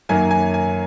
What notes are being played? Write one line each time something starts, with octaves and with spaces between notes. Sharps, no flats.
F#2 D#3 F#3 A#3 G#5
G#5
G#5